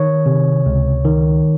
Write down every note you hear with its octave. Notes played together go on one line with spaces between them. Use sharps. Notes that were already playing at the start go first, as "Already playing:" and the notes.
Already playing: D#3 C#5
C3
C#2
D#3